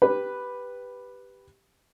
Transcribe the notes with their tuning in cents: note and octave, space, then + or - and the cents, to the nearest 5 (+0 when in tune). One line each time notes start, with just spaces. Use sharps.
G4 +0 B4 +0